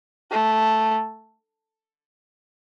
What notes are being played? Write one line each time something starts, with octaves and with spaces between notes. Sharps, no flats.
A3